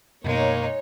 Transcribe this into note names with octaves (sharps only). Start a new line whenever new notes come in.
F#2 B2 G#3 A#3 D#4 C#5